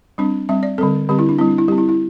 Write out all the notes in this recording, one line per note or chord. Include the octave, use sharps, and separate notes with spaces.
G3 C4 D4
G3 C4 E5
D5
D3 G3 C4 A4
D3 G3 C4 G4
E4
D4
G3 C4 E4
D4
E4
G3 C4 G4
E4
E4